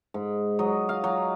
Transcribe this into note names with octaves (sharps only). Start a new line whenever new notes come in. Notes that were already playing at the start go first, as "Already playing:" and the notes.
G#2
F#3 D#5
F5
F#3